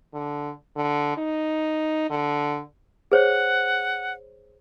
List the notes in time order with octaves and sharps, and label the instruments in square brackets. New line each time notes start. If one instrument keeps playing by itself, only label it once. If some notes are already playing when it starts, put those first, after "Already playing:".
[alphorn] D3
D3
D#4
D3
[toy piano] G#4 C5 C#5 [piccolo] F#5